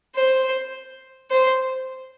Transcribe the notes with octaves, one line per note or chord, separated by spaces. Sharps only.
C5
C5